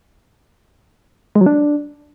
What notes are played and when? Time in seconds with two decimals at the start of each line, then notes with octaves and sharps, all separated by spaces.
1.35 G#3
1.41 F#3
1.46 D4